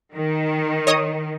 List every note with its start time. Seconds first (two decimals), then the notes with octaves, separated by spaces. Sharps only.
0.15 D#3
0.87 C#5 D#5 D#6